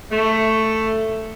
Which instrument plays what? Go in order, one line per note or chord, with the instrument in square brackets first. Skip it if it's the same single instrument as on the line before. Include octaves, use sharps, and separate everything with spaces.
[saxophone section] A3